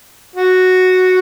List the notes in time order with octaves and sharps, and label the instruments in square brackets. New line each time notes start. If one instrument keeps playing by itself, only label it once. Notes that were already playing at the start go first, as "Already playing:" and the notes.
[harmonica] F#4